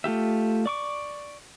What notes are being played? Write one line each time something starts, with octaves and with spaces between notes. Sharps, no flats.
A3 F4 G4 E5
D5 C#6 D6